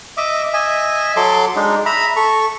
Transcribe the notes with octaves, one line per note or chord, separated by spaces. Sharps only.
D#5 E5 D6
D#5 E5 G#5
F#3 A4 C6 D6
G#3 D4 D#4
E5 A#5 B5
A4 C#6